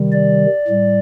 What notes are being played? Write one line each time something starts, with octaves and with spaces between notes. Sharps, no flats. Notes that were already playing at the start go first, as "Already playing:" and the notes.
Already playing: C3 D#3 G3
D5
A2 G3